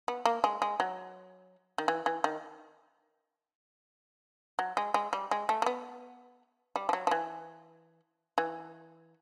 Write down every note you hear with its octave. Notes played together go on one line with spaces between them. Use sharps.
B3
A#3
G#3
G#3
F#3
D#3
E3
E3
D#3
F#3
G#3
G#3
G3
G#3
A3
A#3
B3
G3
F3
F#3
F3
E3
E3